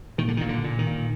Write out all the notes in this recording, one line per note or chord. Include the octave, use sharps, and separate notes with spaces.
A#2 D#3
D3
A#2 D#3
D3
A#2
D#3
A#2